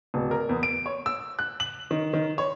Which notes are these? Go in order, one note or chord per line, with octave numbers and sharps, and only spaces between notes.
D1
A#4
E2
D7
C#5
E6
F#6
F#7
D#3
D#3
C#5